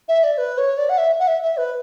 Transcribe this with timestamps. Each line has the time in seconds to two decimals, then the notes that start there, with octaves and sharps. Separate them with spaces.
0.08 E5
0.24 D5
0.38 B4
0.58 C#5
0.78 D5
0.89 F#5
0.98 E5
1.19 F#5
1.28 E5
1.43 E5
1.57 B4